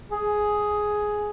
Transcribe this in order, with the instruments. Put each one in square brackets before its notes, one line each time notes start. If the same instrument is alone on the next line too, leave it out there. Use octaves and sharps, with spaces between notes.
[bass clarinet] G#4